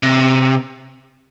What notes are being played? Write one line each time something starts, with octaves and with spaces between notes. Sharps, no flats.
C3